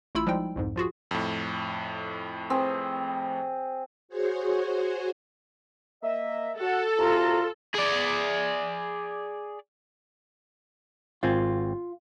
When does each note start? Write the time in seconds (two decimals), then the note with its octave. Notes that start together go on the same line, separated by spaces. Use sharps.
0.15 A1 A3 E4 F4 B5 E6
0.27 F3 G3 G#3 D#4 G5
0.56 C2 F2 G#2
0.76 F3 F4 F#4 G#4
1.11 F2 A2
2.50 C4 G#4
4.09 F#4 G#4 C5 C#5
6.03 A#3 D#5 E5
6.60 F#4 A4 F#5
6.98 C2 F4 F#4 A#5
7.74 G#4 D5
11.23 G#1 C4 F4 G#5